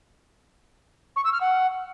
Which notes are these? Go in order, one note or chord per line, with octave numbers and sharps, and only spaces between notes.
C#6
E6
F6
F#5